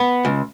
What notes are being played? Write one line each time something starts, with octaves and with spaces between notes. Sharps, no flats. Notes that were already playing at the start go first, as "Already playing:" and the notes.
Already playing: B3
C#2